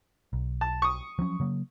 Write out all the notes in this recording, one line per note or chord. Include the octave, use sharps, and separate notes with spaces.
B1
A5
C#6 D#6
F3 F#3 C#4
C#3 F#3 A#3